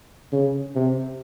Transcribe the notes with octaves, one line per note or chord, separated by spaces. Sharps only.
C#3
C3